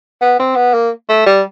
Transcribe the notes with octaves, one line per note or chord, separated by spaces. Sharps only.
B3
C4
B3
A#3
A3
G3